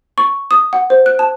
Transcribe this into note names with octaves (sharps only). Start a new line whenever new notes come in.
C#6
D#6
F#5
C5
F#6
A5